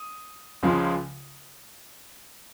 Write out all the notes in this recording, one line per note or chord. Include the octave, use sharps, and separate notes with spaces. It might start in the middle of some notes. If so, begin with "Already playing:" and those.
Already playing: D#6
C#2 C#3 F3 G#3